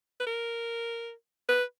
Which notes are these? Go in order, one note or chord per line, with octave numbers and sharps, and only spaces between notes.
B4
A#4
B4